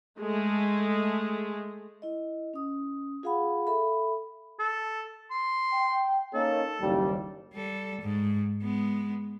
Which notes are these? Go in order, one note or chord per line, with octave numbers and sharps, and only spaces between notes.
G#3 A3
E4 D#5
C#4 D#6
F4 G#4 F5 F#5 B5
A4 E5 B5
A4
C6
G5
A#3 C#4 D#4 A4
F#1 D#2 G3
G3 A4
G#2
G#3 B3